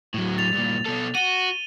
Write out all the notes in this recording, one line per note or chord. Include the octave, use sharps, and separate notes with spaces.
A2 F#3
A6 F7
G2 A#2
B2 A4
F#4 D#7 G7